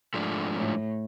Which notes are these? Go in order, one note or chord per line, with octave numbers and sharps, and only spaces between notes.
G#2 F3 A3 D4
A2